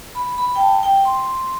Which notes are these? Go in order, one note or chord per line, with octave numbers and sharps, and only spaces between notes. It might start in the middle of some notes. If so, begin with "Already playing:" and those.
B5
B5
G5
A5
G5
C6